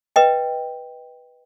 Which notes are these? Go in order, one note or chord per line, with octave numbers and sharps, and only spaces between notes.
B4 D#5 G5